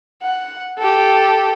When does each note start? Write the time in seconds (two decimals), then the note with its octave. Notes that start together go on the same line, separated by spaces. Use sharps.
0.23 F#5
0.78 G4 A4